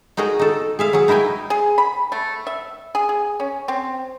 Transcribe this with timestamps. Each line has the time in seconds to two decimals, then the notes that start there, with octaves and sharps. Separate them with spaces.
0.17 D#4 F#4 G#4 A#4 D#5
0.39 D#4 A4
0.79 G#4 E5 F5
0.93 F#3 G#4
1.08 D#4 E4 A#4 G5 G#5
1.50 G#4
1.78 B5
2.12 A3
2.47 E5
2.95 G#4
3.09 G#4
3.40 C#4
3.68 C4